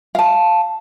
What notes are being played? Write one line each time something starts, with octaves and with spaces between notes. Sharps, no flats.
F5 A5